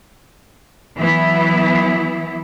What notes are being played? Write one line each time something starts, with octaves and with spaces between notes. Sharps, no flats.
E3 F#3 B3 E4